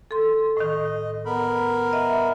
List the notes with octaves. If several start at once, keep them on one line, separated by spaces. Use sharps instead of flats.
A4 C6
A2 D#3 D#5
B3 A#4 B5
D#5 E5